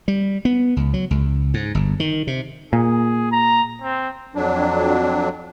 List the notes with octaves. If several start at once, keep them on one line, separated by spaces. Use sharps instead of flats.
G3
B3
C#2
F#3
C#2
G#2
G1
D#3
C3
A#2 G#4
A#5
C4
F2 F#3 D4